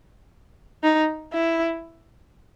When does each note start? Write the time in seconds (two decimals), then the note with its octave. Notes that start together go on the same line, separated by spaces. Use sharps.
0.83 D#4
1.33 E4